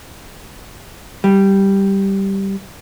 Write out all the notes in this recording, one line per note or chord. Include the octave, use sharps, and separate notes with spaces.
G3